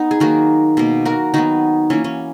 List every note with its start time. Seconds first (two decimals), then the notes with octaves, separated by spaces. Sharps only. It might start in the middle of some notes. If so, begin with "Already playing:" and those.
Already playing: B3 D#4
0.11 G#4
0.20 D#3 F#3 A#3 F#4 A#4
0.77 B2 A#3
1.05 F#4 A#4
1.34 D#3 F#3 B3 D#4 F#4
1.90 E3 A#3 C#4
2.04 C#4